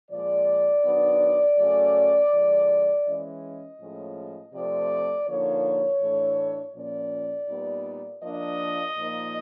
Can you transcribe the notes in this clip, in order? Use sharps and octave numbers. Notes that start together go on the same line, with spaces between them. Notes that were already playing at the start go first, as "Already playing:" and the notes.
A#2 F3 G#3 D5
D#3 F#3 B3 D4
C#3 F#3 A3 C#4
D3 F3 G#3
E3 G#3 C#4 D#5
A2 F3 G#3 C#4
C3 F3 A3 C4 D5
D3 F3 A#3 D#4 C#5
A2 E3 A3 D4
A#2 F3 A#3 C#4 D5
A#2 G3 B3 D#4
F3 A#3 D4 D#5
A#2 F3 A#3 D#4